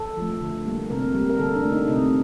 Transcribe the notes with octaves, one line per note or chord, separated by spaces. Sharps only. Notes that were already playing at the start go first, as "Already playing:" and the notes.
Already playing: A4
F3 A3
D3
G3 A#3
C3 A#4
G3 A#3
A#4
D3 A4
D4
A3
D#4
C3 D#4